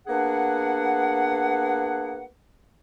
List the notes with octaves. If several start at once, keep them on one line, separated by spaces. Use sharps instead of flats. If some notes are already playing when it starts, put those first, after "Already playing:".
A#3 B3 D4 G#4 F#5